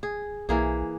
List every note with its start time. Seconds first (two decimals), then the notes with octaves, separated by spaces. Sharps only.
0.03 G#4
0.49 B1 E3 A#3 G#4